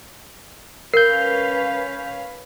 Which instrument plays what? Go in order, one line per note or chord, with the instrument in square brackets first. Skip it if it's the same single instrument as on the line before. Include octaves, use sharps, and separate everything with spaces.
[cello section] C#4 B4 F5 [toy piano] A#4 [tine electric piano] G6 C7